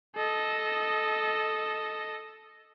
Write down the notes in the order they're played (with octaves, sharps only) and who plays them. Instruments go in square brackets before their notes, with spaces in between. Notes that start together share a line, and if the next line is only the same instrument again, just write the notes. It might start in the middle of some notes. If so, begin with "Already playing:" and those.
[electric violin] A4 D#5